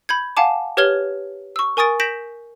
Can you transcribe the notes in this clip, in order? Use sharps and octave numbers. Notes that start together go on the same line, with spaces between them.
B5 G6 G#6
F5 F#5 G#5 A5 D6
G4 B4 C#5 F6 G#6 G7
C#6 E6
A#4 G#5 C#6 D#6 A6 D7
G6 A#6 B6 D7 E7 F#7